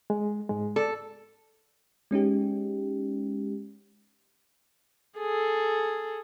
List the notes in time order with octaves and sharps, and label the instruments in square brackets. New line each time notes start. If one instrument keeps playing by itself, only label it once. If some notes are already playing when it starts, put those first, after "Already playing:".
[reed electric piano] G#3
G#2 G#3
[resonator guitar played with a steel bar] A4 [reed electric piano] D5
[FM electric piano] G#3 C#4 D#4 G4
[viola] G#4 A4